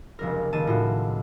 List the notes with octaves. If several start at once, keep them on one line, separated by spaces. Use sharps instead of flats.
F1 C#2 A#4
C#2 D#3 A#3 A5 D#7
A2 F4 F#4